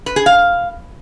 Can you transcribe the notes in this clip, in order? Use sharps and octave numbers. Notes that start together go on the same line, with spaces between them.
B4
G#4
F5